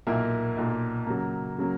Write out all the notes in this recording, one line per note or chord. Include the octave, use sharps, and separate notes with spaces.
B1 A#2 A#3 E4 A#4
B1 A#2 A#3
C#3 F#3 A#3
C#3 F#3 A#3